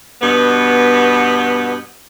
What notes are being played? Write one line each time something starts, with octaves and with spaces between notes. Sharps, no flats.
G2 B2 B3